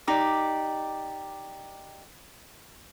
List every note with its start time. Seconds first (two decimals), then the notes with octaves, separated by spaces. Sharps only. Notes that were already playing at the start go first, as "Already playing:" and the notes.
0.07 D#4 G4 D5